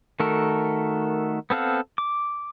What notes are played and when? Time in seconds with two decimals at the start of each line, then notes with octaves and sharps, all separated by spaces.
0.20 D#3 A3 F#4 A4 A#4
1.50 B3 C4 A4 F5 F#5
1.98 D6